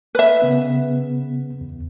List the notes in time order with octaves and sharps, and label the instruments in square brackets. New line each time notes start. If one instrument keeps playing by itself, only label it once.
[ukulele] B4 E5
[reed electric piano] C#3 B3
E2